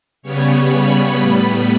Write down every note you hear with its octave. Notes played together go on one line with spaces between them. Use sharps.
C#3 G3 B3 C#5
B5
A2 G3 B3